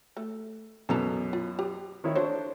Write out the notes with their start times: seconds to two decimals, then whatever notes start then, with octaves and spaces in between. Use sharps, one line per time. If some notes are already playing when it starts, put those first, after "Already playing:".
0.17 A3
0.89 F#2 B2 E3 A4 A#5
1.33 F4
1.59 G4
2.04 D#3 E4 C#5
2.15 D4 F#4 A4 C5 C#5